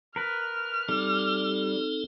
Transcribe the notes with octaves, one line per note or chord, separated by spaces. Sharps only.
A#4 B4 F6
G3 C4 D#4 A4